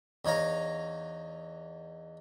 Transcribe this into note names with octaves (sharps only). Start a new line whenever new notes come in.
E2 D#4 C#5 F5 A#5